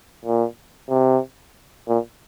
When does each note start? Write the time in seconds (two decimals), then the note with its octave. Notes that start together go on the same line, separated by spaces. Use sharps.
0.25 A#2
0.89 C3
1.88 A#2